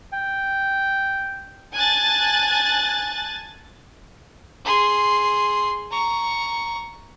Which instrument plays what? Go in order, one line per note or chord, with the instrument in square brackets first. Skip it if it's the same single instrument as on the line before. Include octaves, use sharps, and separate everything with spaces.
[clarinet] G5
[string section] G#5 A5 F#6 A6
[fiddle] G#4 C6
A#5 C#6